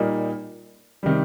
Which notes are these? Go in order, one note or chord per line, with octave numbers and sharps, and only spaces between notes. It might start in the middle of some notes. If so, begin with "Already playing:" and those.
Already playing: A#2 G3 A#3 D#4
C3 D#3 G3